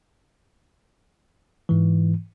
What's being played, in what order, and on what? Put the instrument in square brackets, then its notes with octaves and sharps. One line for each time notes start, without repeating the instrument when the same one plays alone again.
[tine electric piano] G#2 E3